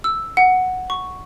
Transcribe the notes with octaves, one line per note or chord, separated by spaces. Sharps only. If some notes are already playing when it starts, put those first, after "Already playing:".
E6
F#5
C#6